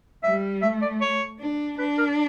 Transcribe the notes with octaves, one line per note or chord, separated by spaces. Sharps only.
G3 E5
A3 E5
D5
C#5
D4
D4 B4
A#4